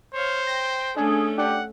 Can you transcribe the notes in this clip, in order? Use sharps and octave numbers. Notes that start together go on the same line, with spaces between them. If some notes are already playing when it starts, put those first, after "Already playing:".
C5 C#5 F5
G5 A#6
A3 C#4 D4 G#4
D4 G4 F#5 G5